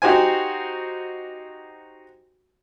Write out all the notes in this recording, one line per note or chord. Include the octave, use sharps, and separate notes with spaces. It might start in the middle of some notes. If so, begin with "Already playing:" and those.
D#4 F#4 G4 C5 G#5